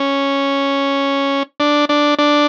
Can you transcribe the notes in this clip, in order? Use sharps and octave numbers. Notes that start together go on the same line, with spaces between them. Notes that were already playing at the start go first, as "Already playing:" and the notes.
Already playing: C#4
D4
D4
D4